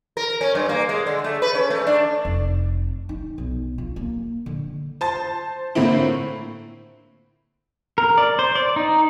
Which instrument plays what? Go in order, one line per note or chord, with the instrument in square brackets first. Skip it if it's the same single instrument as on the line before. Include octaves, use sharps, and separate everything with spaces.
[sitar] A#4
C#4
G2
A#3
G#3
D3
A3
B4
C#4
A3
D4
[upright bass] F1
D#4
B1
F4
A#3
D3
[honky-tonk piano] C5 A5 A6
A2 D3 A#3 C4 E4
[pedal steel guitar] A#4
D5
C5
D5
D#4